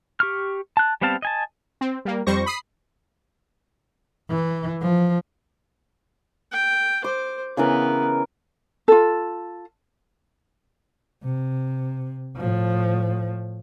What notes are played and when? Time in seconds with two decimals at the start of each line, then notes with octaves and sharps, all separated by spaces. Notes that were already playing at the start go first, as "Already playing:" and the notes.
0.20 G4 C#6 F6
0.77 A5 F#6
1.01 G3 B3 C4 F5 A5
1.22 D#5 G#5 A5
1.81 C4
2.05 G3 A#3
2.27 F2 G3 C5 C#6 A#6
2.46 B5 D#6 C7
4.30 E3
4.81 F3
6.52 G5
7.04 C5 D6
7.57 C#3 E3 B3 A#4
8.88 F4 A4
11.23 C3
12.37 A2 F3